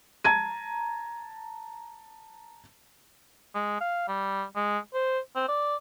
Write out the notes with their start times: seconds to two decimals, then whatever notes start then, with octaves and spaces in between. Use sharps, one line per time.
0.24 A5 A#5 G#6 D#7
3.55 G#3
3.80 F5
4.08 G3
4.56 G#3
4.94 C5
5.36 C4
5.48 D5